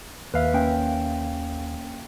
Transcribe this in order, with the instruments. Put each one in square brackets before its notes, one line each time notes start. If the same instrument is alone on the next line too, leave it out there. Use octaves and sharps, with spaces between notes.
[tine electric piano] D#2 F5 [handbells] B4 E5
[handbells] A#3 C#4 G5